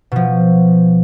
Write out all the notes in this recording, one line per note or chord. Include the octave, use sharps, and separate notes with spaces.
B2 F3